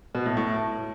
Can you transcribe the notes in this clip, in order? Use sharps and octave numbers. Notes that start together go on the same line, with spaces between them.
B2
A2
A2